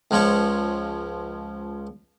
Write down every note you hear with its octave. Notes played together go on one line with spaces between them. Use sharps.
C#2 F3 C#5